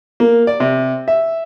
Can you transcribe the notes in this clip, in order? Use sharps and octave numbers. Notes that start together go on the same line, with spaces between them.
A#3
D5
C3
E5